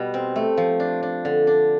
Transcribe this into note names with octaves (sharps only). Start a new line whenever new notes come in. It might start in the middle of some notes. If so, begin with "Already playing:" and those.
Already playing: B2 G3
C4
A3
F3
D4
D4
D3
D4